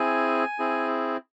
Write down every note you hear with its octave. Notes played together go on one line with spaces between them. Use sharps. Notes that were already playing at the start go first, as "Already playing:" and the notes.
Already playing: C4 E4 G#4 G#5
C4 E4 G#4